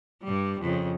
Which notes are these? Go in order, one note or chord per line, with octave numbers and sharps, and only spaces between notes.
G2 G3
F2 C#3